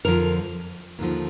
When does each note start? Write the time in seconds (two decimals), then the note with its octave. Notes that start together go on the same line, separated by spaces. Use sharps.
0.05 F2 D3 F3 A#4
0.99 D#2 D3 F3